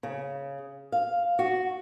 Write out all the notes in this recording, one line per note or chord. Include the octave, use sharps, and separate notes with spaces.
C#3
F5
F#4